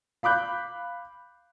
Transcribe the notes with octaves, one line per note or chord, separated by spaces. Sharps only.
F5 B5 D6 F#6 G6